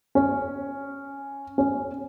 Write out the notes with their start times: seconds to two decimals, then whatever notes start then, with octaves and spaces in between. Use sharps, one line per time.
0.15 C#4
1.58 C#4